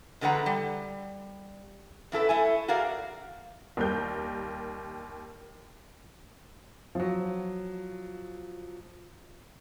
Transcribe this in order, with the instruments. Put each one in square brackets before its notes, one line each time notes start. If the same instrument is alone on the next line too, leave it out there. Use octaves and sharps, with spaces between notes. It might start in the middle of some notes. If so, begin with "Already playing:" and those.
[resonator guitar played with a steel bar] E2 D3 G#3 B4 F#5 A#5
G3
F#2 E4 A4 B4
A3 E4 G#5
F#4 G#4 A#4 D5 F5
[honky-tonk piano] D#2 G3 A#4 G6
[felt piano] F3 F#3